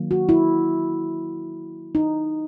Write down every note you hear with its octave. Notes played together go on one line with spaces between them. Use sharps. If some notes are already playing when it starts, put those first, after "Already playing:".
Already playing: D#3 F#3 A#3
F#4
E4
D#4